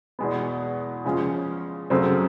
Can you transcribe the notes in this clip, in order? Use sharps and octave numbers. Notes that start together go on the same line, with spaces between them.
E2 B2 G#3 B3
C#3 F3 G#3 C#4
F#2 C#3 F#3 A3 C4